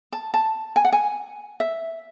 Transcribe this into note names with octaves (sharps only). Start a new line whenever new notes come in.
A5
A5
G#5
F#5
G#5
E5